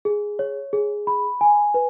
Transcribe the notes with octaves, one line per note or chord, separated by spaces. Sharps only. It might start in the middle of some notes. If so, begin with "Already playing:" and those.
G#4
C#5
G#4
B5
G#5
B4